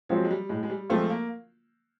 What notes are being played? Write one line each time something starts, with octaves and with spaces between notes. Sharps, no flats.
F3 F#3 G#3 C4 F4
G#3
G3
A2 G#3
G#3
G3
F3 G#3 A3 C4 F4
A#3